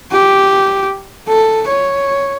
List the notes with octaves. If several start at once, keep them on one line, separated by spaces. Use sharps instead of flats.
G4
A4
C#5